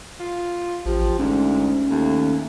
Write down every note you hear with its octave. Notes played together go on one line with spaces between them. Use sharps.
F4
A1 F3 G4
D2 G#2 C#4
D#2 A3